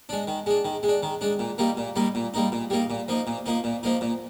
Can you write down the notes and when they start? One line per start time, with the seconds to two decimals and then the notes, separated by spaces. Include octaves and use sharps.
0.09 G#3 D4
0.27 D#3
0.46 G#3 D4
0.65 D#3
0.83 G#3
0.88 D4
1.03 D#3
1.21 G#3 D4
1.39 A#2
1.58 G3 A#3 D#4
1.77 A#2
1.96 G3 A#3 D#4
2.15 A#2
2.34 G3 A#3 D#4
2.52 A#2
2.70 G3 A#3 D#4
2.90 A#2
3.08 F3 A#3 D#4
3.27 A#2
3.46 F3 A#3 D#4
3.64 A#2
3.83 F3 A#3 D#4
4.01 A#2